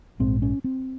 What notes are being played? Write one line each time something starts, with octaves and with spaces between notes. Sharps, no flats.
A#1 G#2 C4
C#4
C4